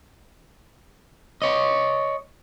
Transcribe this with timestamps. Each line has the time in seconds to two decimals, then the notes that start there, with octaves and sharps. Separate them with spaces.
1.42 C#5 D#5